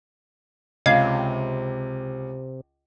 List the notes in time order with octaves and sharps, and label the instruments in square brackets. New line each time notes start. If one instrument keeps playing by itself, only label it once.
[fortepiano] C#2 [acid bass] C3 [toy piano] D#5 [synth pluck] F5